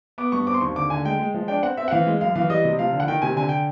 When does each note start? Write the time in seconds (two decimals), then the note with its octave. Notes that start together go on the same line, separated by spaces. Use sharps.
0.18 B3 D6
0.32 G2 C#6
0.47 C4 D6
0.54 C6
0.61 D#2 C#6
0.76 D3 D6
0.90 D3 G#5
1.05 G#3 G5
1.19 G#3
1.34 F3
1.48 D4 G5
1.62 C4 F#5
1.77 C4 E5
1.88 F#5
1.91 E3 F5
2.07 G#3
2.21 F#2 F5
2.35 E3 F5
2.50 G3 D#5
2.64 C3
2.79 F3 F5
2.93 D3
3.00 F#5
3.08 D#3 G5
3.22 C3 G#5
3.36 D3 G#5
3.49 G5